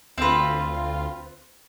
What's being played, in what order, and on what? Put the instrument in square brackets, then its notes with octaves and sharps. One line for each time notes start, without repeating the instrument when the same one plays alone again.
[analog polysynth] D2 F4 [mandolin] C4 B4